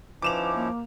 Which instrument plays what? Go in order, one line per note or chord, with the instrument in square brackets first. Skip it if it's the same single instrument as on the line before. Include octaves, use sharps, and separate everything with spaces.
[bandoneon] F3 [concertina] C#4 D#4 E4 [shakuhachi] B4 [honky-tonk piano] D6 E7 F7
[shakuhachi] A#3